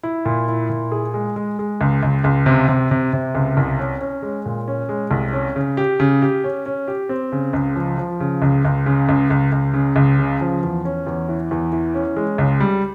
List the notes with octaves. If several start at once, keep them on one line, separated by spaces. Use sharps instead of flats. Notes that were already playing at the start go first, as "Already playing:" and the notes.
E4
A#2
E4
A#2
G#4
G#3
G#3
G#3
C#2
C#2
C#2
C3
C3
C3
C3
C#2
C2
C#4
C#4
G#3
A#2
C#4
G#3
C2
C#4
C#3
G4
C#3
G4
C#4
C#4
G4
C4
C#3
C#2
F3
F3
C#3
C#2
C#2
C#3
C#2
C#2
C#2
C#3
C#2
C#3
F3
E2
C#4
E2
E3
E2
E3
C#4
G#3
C#2
G3